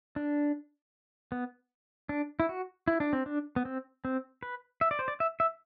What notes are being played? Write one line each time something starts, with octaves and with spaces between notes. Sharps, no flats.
D4
B3
D4
E4
F#4
E4
D4
C4
D4
B3
C4
C4
B4
E5
D5
C5
D5
E5
E5